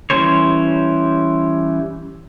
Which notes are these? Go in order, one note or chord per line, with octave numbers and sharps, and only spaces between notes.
E3 G3 C#4 C5 C#5